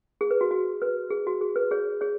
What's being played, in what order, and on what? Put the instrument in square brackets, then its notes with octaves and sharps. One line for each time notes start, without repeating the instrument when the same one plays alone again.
[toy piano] G#4
B4
F#4
F#4
B4
G#4
F#4
G#4
B4
G#4 C#5
G#4 C#5